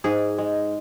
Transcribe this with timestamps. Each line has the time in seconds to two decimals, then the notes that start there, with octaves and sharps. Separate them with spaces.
0.04 G#2 G#4
0.38 G#3